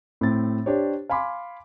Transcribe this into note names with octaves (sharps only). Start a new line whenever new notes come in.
A2 C4 A6
D4 G4 C5 C#5
F5 G#5 B5 C6 D6